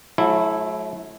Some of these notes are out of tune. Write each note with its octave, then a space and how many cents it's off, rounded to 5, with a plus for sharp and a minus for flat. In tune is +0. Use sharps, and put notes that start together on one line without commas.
F#3 -40 A3 -45 E4 +0